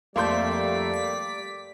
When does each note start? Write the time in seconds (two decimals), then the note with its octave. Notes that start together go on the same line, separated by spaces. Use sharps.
0.16 F2 G3 A3 A#3 D5 C6 G6 B6
0.94 B6